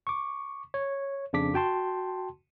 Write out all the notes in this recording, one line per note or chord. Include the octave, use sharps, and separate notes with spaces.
C#6 D6
C#5
F2 C#3 D4 D6 B6
F#4 G5 A5 C6